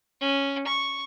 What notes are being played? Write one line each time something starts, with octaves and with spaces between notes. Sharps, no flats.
C#4
C#6